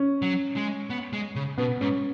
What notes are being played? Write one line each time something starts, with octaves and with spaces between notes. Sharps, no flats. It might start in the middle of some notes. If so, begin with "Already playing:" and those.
Already playing: C#4
F#3
G#3
B3
G#3
C#3
B2 B3
G#2 C#4